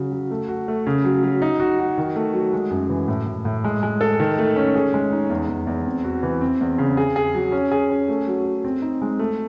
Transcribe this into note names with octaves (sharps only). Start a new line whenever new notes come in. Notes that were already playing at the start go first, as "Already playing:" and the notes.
Already playing: C#3 F#3
F#3
A3
F#4
A3
C#3
F#3
F#3
D#4
F#4
F#4
D#3
A3
F#3
G#3
F#2
E3
A2
A2
A2
G#3
G#3
A4
D#3
A3
C#4
G#4
G#3
D#4
E2
E2
E2
C4
F#4
E3
C4
E2
C#3
G#4
G#4
F#3
C#4
G#4
C#4
A3
F#3
F#3
C4
D#4
G#3
A3